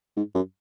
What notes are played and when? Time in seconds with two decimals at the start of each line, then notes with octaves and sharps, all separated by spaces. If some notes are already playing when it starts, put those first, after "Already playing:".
0.16 G#2
0.35 F#2